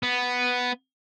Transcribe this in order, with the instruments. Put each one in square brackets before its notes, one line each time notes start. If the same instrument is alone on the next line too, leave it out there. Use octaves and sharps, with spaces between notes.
[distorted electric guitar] B3